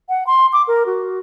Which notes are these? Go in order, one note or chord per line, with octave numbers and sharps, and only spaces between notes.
F#5
C6
D6
A#4
F#4